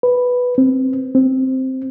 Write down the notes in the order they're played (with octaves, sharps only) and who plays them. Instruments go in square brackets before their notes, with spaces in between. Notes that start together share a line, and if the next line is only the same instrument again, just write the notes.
[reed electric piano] B4
C4
C4